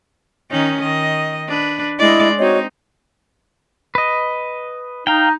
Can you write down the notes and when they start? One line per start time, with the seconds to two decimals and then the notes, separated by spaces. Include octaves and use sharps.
0.51 D#3 C#4 D#4
0.81 D#3 D#5
1.49 D4 B4
1.99 G#3 E4 D5 D#5
2.39 C4 D#4 F#4 C#5 D#5
3.95 B4 D#5
5.07 D#4 F5 G5